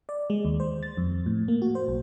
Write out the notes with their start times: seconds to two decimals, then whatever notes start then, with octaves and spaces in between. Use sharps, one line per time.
0.09 D5
0.30 G#3
0.45 D#2
0.60 C5
0.83 A6
0.97 F2
1.26 A2
1.48 A#3
1.62 F#4
1.75 C5
1.88 B1